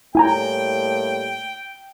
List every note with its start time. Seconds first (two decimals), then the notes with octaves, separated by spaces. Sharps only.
0.15 A2 G3 A#3 E4 G5 G#5 A#5